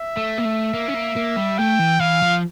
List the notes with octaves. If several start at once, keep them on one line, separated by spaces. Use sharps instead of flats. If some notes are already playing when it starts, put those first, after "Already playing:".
Already playing: E5
A3
A#3
A3
A#3
C#4
A#3
A#3
G3
A3 G5
E3
E3 F5
F3